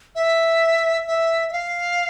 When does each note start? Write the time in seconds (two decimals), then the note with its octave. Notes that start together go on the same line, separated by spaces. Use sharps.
0.15 E5
1.07 E5
1.49 E5
1.53 F5